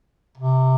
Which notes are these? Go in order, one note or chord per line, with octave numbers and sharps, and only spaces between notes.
C3